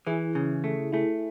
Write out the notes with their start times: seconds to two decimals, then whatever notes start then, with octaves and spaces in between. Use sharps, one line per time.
0.07 E3 E4 G#4
0.35 C#3
0.64 A3
0.92 A3 E4 G#4